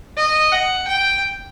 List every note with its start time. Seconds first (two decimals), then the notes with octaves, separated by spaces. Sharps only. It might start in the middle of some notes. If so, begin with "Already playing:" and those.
0.18 D#5
0.52 F#5
0.88 G5